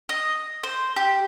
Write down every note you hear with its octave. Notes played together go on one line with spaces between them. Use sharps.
D#5
C5
G4